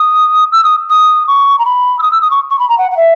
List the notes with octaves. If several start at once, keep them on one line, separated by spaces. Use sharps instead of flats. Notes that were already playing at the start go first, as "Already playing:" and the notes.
Already playing: D#6
E6
D#6
D#6
C#6
A#5
B5
E6
D#6
E6
D#6
C#6
C#6
B5
A#5
F#5
F#5
E5